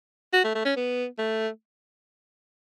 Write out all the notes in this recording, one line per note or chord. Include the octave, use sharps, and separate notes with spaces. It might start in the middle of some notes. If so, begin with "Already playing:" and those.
F#4
A3
A3
C#4
B3
A3